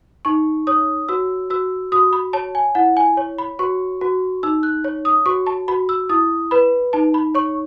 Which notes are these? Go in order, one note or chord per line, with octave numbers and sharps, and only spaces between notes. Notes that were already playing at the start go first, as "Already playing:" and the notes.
D#4 C#6
C#5 D#6
F#4 E6
F#4 E6
F#4 D#6
B5
C#5 A5
G#5
E4 F#5
G#5
C#5
B5
F#4 C#6
F#4
D#4 E6
F#6
C#5
D#6
F#4 C#6
A5
F#4 B5
E6
E4 D#6
B4 B5
D#4 A5
B5
C#5 C#6